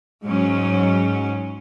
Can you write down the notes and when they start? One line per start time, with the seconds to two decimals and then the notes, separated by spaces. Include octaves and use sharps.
0.24 G#2 F#3 C#4